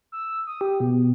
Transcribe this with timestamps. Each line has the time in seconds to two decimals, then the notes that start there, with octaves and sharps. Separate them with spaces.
0.12 E6
0.47 D#6
0.61 G4
0.80 B2